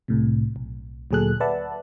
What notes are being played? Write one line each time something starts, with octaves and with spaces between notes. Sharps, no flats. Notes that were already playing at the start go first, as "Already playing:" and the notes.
C2 A2 C3
B1
D2 A#2 F#3 G#4 A4 F#6
B4 D5 E5 F#5 A5